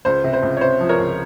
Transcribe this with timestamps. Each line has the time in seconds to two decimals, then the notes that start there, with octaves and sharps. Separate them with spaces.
0.05 C#2 C5
0.24 C3
0.33 C5
0.43 C#2
0.57 C#5
0.61 C3 C5
0.80 F3
0.89 A#4 C#5
0.99 C#2